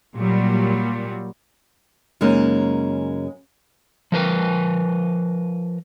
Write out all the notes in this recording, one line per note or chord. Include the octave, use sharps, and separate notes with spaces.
A#2 F#3 G3
F#2 C#3 G#3 A#3 D#4
F3 A#4 B4